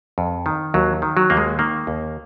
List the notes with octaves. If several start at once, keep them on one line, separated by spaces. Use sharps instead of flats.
F2
D#3
D#2 F#3
D#3
F#3
D#2 A#3
G#3
D#3 A#3
D#2